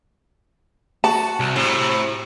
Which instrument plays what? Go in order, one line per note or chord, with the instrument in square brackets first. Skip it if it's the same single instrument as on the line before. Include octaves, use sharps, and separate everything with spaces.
[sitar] F#4 [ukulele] A5
[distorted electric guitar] C2
[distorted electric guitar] A2 [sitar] C3